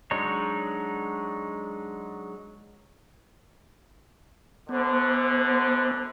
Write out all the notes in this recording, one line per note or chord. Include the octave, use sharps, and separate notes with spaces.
F#3 G#3 D4 D#4 C#5
F#2 B2 D3 B3 C5